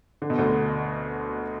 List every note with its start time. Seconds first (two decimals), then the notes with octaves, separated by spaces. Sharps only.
0.22 D3
0.30 B2
0.38 D2 D3